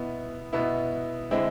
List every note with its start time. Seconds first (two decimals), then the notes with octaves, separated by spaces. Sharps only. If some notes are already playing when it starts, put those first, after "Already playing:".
Already playing: B2 B3 E4
0.53 B2 B3 E4
1.31 D3 G#3 C4 E4